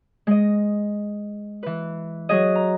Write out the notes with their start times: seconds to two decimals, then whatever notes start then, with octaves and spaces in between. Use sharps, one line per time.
0.27 G#3 D#5
1.63 E3 B4
2.29 F#3 G#4 D#5
2.55 A#5